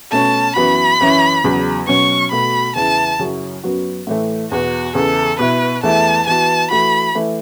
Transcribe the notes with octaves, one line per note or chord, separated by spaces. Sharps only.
B2 A3 C#4 A5
F#2 E3 B3 F#4 B5
F#2 E3 C#4 E4
E2 C#3 F#3
B2 F#3 C#4 C#6
B2 A3 F#4 B5
E2 C#3 E3 B3 E4 A5
F#2 C#3 F#3 C#4 E4
F#2 F#3 B3 F#4
A2 E3 A3
E2 B2 B3 F#4
E2 C#3 E3 A4
B2 B3 E4 B4
E2 E3 A3 E4 A5
E3 B3 F#4 A5
E3 A3 F#4 B5
E3 A3 E4